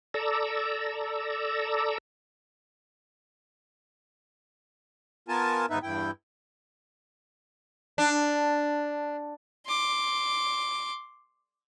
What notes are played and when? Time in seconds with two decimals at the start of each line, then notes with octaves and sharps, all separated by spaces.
0.14 A4 D5 A#5 E6
5.28 B3 F4 A#4 G#5 A5
5.70 D#2 G#2 B3 D#4 B4 E5
5.83 E2 G2 E4 G5
7.98 D4
9.67 C6 D6